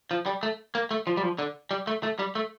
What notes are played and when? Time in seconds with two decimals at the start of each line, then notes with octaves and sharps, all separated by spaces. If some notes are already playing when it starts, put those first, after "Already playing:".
0.11 F3
0.26 G3
0.43 A3
0.75 A#3
0.91 A3
1.07 F3
1.17 G3
1.23 F3
1.38 D3
1.71 G3
1.87 A3
2.03 A3
2.19 G3
2.35 A3